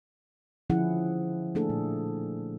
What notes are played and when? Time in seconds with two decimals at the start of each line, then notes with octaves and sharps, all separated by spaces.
0.70 D3 F3 C#4 E4 G#4 F#5
1.55 A3 A#3 D4 G#4 A4
1.70 A#2